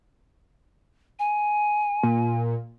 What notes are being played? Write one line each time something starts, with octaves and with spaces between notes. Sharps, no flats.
G#5
A#2